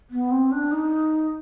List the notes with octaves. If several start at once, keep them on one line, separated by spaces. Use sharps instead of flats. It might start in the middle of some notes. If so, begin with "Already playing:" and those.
B3
C4
D4
D#4